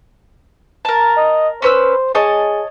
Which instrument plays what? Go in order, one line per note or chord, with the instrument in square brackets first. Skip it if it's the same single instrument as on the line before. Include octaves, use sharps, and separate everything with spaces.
[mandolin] A#4 A5
[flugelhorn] D#5
[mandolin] C#4 B4 E6 [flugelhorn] C5
[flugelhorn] G#4 [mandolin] C#5 D#5 A5